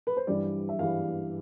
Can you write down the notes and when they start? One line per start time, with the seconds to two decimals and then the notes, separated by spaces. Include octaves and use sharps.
0.07 B4
0.17 C5
0.27 G2 E3 G3 D5
0.69 E5
0.79 G2 E3 G3 F5